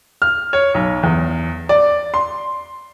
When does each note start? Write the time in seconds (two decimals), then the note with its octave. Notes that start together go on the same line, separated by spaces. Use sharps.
0.22 F6
0.53 C#5
0.74 B1
1.03 E2
1.69 D5
2.14 C6